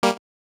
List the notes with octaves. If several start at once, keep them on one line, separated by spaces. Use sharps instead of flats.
G3 A#3